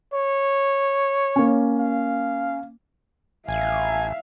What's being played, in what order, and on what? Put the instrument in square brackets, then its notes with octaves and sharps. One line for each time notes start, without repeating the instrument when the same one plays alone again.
[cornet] C#5
[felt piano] A#3 C#4
[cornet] F5
[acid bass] A1 [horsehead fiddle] E5 F5 [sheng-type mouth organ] G#5